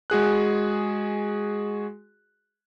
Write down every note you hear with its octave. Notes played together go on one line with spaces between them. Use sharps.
G#3 F#4 G#4 F#6